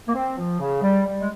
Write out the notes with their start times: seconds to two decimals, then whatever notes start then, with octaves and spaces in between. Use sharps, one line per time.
0.08 A#3
0.14 C4
0.37 F3
0.60 C#3
0.83 G3
1.06 G3
1.20 G#3